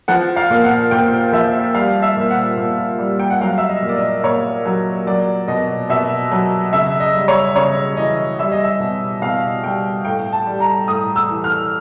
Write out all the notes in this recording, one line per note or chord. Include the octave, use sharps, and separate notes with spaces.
F3 F#5
F5
A#2
F#5
A#2 G5
F3 E5
G3 F5
E5
A#2
F#5
A#2
G3
G5
F#5
F#3 F5
E5
D#5
A#2
D5
D#5
A#2 C#5
F#3
F#3 D5
B2 D#5
B2 E5
F#3
C#3 E5
D#5
G3
C#5
C#3 C#5
E3 D#5
G3 E5
D#5
E5
B2
B2 F5
G3 G5
A2 G5
A5
G3
A#5
A2 D#6
E6
E3
F6